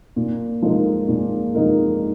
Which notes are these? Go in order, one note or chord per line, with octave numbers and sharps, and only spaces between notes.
A#2
F3 G#3 D#4 A#4
A#2
F3 G#3 D#4 A#4